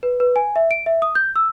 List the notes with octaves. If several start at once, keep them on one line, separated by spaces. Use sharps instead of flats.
B4
B4
G#5
E5
D7
E5
D#6
G6
E6